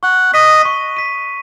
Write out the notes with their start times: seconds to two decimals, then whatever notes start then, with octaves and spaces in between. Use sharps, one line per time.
0.03 F#5 C#6
0.34 D#5 B6 D#7
0.65 C#6
0.97 B6 D#7